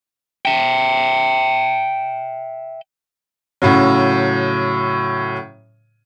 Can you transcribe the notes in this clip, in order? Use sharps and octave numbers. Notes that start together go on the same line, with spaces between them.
E5 G5
A2 C#3 F#3